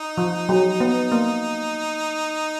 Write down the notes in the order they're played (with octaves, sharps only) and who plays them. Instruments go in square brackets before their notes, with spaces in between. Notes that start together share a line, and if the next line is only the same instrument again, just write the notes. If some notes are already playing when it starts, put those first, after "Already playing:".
Already playing: [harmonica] D#4
[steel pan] F3
F#3
B3
A#3